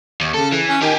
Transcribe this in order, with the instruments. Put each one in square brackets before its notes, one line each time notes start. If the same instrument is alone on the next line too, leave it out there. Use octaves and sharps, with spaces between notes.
[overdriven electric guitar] D#2
[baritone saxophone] C#3 [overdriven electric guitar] A4
[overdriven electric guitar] E3
[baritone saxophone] C#4
[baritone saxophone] D#3 [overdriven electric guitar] G4 G#4